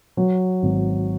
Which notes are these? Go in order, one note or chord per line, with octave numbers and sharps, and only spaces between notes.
F#3
G#1